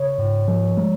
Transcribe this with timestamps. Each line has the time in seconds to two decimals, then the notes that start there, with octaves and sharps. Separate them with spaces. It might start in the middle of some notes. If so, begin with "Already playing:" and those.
Already playing: C#3 C#5
0.18 G#2
0.48 F3
0.78 G#3